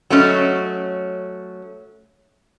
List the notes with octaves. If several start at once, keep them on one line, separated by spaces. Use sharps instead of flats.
F#3 A3 C#4 D#5